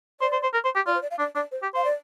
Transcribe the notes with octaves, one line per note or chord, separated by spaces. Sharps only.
C5 D5
C5
C5
A#4
C5
G4
F4 D5
C5
D5
F5
D4 D5
D4 D5
C5
G4
C5 F5
D5